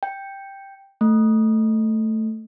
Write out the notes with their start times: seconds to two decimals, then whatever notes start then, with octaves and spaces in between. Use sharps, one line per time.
0.03 G5
1.01 A3